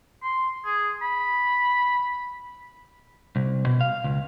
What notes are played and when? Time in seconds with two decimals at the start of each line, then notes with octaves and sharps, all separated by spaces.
0.23 C6
0.64 G#4
1.01 B5
3.36 C2
3.66 B2
3.81 F5
4.04 C#2